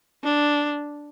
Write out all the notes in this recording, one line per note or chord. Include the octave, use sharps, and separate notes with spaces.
D4